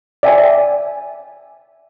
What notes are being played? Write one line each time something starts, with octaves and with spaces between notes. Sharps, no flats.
D5 E5 G5 G#5